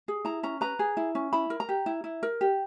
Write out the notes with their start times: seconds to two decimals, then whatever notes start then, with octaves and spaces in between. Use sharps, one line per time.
0.08 G#4
0.25 E4 A#5
0.43 C#4 A#5
0.61 B4 A#5
0.79 G#4
0.97 E4
1.15 C#4
1.33 E4 B5
1.50 A#4
1.60 A#5
1.69 G4
1.86 E4
2.04 E4
2.23 A#4
2.41 G4